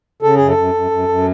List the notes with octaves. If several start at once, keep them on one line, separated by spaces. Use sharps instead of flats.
C#3 A4
F#2 G#4
A4
F#2
F#2
F#2
F#2